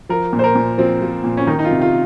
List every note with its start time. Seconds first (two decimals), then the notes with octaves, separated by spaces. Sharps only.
0.09 F3 A#4
0.33 A#2
0.39 C5
0.44 A#4
0.55 A#2
0.78 F3 C4
1.02 F3
1.24 A#2
1.37 C#4
1.47 D#3 D#4
1.59 D#4
1.65 F4
1.71 C3
1.81 F4